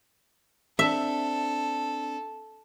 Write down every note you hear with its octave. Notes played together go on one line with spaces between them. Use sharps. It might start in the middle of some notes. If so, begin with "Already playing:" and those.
C4 D4 A4 E5